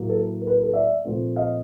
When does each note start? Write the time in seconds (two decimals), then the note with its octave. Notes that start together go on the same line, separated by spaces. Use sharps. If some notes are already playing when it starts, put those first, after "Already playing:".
Already playing: A2 F#3 A#3
0.09 A4
0.42 A#4
0.47 B4
0.53 A#4
0.63 A4 B4
0.73 D5 E5
1.05 A#2 F3 A3 C4
1.36 D#5 F5